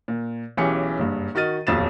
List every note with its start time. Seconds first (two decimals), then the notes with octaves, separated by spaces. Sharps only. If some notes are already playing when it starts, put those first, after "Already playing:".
0.08 A#2
0.57 B1 E3 C#4 G4 G#4 C#7
0.99 F#1 G2
1.35 D#3 F#4 D#5 F6 A6 D#7
1.67 D#1 B1 F2 A6 E7